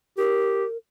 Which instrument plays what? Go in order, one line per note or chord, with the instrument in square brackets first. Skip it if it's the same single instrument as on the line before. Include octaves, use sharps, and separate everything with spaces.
[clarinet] G4 [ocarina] A#4